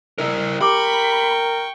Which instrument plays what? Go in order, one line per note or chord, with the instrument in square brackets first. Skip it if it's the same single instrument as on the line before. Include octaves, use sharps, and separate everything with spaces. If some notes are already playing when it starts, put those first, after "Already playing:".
[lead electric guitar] E4 A#4
[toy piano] G4 D6 [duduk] A#4 [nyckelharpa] G5 C#6 [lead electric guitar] B5